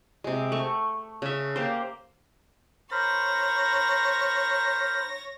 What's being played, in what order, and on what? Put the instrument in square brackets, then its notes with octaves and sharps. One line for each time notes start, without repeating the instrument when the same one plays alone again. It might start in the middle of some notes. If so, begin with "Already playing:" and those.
[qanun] C3 G#3
A3 C#6
C#3 E5
A#3 G4 C5
[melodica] A#4 C5 B5 [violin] C#5 A#6